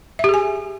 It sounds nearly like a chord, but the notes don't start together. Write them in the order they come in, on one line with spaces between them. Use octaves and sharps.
E5 G4 G#4 G#5